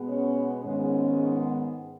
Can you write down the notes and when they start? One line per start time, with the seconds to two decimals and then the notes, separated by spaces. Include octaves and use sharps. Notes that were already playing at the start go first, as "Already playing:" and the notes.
Already playing: B2 G#3 B3
0.09 C#4
0.64 G#2 D#3 G#3 B3 C#4